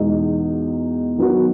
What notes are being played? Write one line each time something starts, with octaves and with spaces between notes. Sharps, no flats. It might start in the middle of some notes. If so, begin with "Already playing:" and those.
Already playing: E2 B2 G#3 D#4
D#3 F#3 B3 D#4 F#4